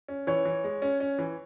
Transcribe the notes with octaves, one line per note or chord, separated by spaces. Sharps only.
C#4
E3 C#5
E3
G#3
C#4
C#4
E3